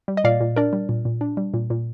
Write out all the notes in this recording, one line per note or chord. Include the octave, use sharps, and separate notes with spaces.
G3
D#5
A#2 D5 F5
A#2
D4 A#4 D5
G3
A#2
A#2
D4
G3
A#2
A#2